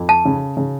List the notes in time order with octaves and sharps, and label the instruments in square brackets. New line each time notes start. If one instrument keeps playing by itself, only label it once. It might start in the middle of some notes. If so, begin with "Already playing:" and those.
Already playing: [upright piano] F2
[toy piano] A5
[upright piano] C#3
C#3